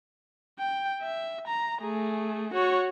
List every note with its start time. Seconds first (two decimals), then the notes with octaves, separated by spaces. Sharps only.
0.59 G5
1.02 E5
1.47 A#5
1.82 A3 G#4
2.54 F#4 C#5